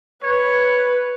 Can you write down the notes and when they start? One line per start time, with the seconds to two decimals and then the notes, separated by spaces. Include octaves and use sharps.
0.24 B4 C#5